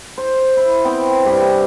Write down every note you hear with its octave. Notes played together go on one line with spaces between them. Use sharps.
C5
E4
B3 C4 G5
G2 G4